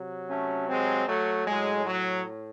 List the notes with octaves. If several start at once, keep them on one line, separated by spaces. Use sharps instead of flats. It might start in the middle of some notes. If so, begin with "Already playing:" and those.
Already playing: C3 F#3
A3 C#4
G#3 C4
F#3 A3
A2 F#3 G#3
F#3